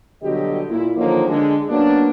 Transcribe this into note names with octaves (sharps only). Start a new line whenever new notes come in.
B2 D3 F#3 G3 G4 D#5
A#2 E4
D3 D#3 F3 F#3 A#3
D3 G#3 D4
F#2 F#3 A#3 B3 D4